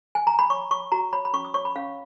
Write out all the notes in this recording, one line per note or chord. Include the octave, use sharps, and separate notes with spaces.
G#5
A#5
B5
C#5 C#6
C#5 C#6
F#4 A#5
C#5 B5
B5
C#4 C#6
D#6
C#5 C#6
B5
C#4 F5